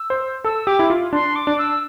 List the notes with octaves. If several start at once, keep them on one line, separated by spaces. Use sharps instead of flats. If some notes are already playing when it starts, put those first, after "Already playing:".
Already playing: E6
C5
A4 E6
G4 D6
E4
F4
D4 C6
D6
D4
E6